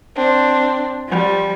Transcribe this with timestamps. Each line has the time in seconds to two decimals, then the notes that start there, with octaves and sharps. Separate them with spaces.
0.14 C4 D4
1.07 F3 G3